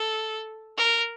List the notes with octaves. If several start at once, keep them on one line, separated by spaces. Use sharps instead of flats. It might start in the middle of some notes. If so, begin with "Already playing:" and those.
Already playing: A4
A#4